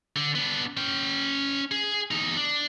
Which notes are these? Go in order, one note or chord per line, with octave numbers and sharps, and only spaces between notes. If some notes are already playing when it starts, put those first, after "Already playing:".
D3
B3 D4
C#4 G5
G#4
E2 D#4
D4